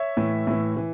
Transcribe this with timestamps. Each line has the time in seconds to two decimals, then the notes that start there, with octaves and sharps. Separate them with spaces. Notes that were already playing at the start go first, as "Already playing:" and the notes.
Already playing: C#5 E5
0.17 A2 E3
0.47 A2 E3
0.77 E3